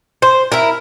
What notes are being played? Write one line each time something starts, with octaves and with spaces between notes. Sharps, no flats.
C5
E4 A#4